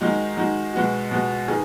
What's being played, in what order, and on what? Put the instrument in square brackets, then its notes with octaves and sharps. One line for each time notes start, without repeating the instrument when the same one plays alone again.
[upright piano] D#3 G#3 D#4 F#4
D#3 G#3 D#4 F#4
B2 G#3 B3 F#4
B2 G#3 B3 F#4
D#3 B3 G#4